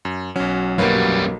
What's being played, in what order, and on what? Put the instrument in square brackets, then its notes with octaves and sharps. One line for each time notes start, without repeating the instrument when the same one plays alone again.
[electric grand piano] F#2
[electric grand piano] B1 C#4 [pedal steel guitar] F#3
[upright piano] B1 A#3 [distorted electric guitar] F#2 G3 [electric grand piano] B4 C#5 F5